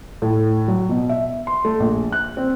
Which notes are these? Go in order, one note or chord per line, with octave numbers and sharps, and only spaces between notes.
A2
F#3
B2
E5
C6
A3
A#1
F#6
C4